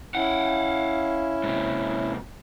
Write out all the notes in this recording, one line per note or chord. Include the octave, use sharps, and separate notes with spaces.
C#4 E4 F5 F#5
G#2 C3